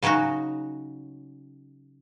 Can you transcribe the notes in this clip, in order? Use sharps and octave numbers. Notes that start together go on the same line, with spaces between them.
C#3 F#3 C#4 D#4 F#4